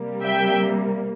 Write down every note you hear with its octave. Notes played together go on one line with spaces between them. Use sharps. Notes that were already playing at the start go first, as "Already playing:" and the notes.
Already playing: C3 G3 A#3
E5 G5